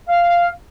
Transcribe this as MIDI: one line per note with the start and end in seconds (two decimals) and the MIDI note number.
0.08 0.48 77